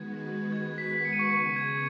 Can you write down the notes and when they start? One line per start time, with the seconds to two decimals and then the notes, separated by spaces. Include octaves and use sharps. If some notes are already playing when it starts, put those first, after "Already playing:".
Already playing: D#3 G#3 B3 F#4 B4 G#6
0.52 G#6
0.78 B6
1.05 C#7
1.13 D#7
1.19 C#6 C#7
1.31 C#3 B3 G#4 B6
1.56 G#6